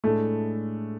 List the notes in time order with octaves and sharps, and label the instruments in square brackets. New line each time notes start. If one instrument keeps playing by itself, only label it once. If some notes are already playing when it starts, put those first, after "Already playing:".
[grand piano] A2 G#3 D4 [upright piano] A3